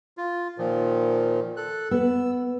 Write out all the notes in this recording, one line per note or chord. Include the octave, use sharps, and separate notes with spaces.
F4
A#2 D#3 F3
A4 F#6
B3 E6